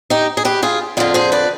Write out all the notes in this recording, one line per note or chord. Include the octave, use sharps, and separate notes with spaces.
D#4 G4
G#4
G4 B4
F4 G#4
F2 D3 F4 G#4
G#4 C5
B4 D5